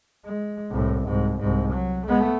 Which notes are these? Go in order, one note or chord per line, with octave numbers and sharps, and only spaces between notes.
G#3
C2 A2
C2 G#2
C2 G#2
F#3
A3 B3